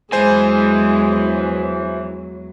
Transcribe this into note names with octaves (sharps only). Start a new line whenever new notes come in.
E2 E3 F#3 G#3 C5 G#5